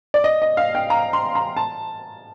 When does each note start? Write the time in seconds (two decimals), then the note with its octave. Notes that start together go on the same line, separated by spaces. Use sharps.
0.14 D5
0.24 D#5
0.42 D#5
0.57 F5
0.75 G5
0.90 A#5
1.13 C6
1.35 A#5
1.57 A5